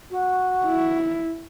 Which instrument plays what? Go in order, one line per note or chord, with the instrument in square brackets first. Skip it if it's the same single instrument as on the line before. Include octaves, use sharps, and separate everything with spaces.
[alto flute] F#4
[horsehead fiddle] E4